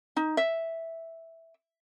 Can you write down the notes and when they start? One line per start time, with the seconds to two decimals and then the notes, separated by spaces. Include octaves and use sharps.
0.16 D#4
0.37 E5